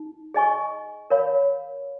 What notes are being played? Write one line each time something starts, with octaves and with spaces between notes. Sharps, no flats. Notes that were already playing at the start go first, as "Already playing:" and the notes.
Already playing: D#4
G#4 D#5 G#5 C#6
A#4 C#5 F5 B5